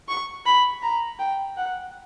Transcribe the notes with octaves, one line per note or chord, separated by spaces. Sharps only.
C#6
B5
A#5
G5
F#5